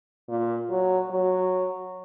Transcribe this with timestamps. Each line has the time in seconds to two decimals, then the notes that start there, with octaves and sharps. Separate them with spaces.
0.29 A#2
0.70 F#3
1.11 F#3